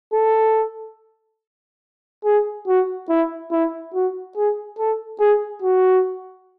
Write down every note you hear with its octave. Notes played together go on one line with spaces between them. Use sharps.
A4
G#4
F#4
E4
E4
F#4
G#4
A4
G#4
F#4